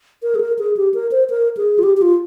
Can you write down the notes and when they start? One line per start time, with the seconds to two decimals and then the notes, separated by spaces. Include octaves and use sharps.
0.23 A#4
0.35 G#4
0.41 A#4
0.59 G#4
0.77 G4
0.94 A#4
1.12 C5
1.30 A#4
1.57 G#4
1.79 F4
1.83 G4
1.97 G4
2.02 F4